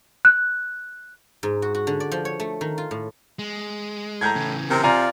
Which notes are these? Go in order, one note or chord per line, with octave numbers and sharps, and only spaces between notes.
F#6
G#2
F#4
F#4
D3
D5
F3
C#5
A3
D#3
F4
A2
G#3
A2 A#5 G6 G#6
C#3 E3
C3 C4 A#4
F4 D5 F5 G#5 A#5